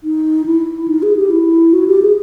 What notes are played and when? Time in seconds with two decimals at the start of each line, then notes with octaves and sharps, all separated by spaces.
0.04 D#4
0.46 E4
0.88 D#4
1.03 G#4
1.17 G4
1.31 E4
1.73 F#4
1.88 G4
2.02 G#4